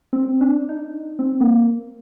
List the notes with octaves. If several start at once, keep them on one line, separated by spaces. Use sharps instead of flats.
C4
D4
D#4
C4
A#3